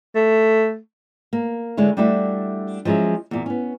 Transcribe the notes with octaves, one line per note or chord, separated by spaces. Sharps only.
A3
A#3
D3 G#3 E4 C#5
G3 A3 D4 E4 F#4 A4
F3 F#3 G#3 C#4 E4
E2 A#2
B3 C#4